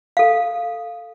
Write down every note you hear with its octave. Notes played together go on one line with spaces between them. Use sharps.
A4 F5